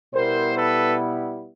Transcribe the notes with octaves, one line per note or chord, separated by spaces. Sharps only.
B2 G3 B3 E4 A#4 C5
A4 B4